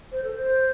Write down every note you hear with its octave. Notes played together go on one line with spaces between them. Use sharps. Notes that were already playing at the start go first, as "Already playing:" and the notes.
C5
A4
C5